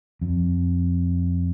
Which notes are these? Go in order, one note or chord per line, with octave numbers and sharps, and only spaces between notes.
F2